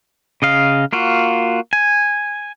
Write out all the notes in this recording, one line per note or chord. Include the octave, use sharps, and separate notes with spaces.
C#3 D#5 F5
A#3 F4 F#4
G#5